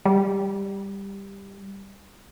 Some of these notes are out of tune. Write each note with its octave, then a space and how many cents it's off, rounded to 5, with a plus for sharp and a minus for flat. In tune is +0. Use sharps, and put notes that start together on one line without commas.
G3 +10